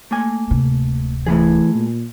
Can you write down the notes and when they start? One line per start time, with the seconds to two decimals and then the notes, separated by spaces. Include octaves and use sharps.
0.11 A3 A#3 G#5
0.50 D1 C3
1.26 E3 A3 E4 G#4
1.75 A#2